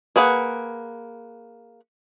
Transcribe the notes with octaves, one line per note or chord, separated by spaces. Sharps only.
A#3 G#4 B4 F#5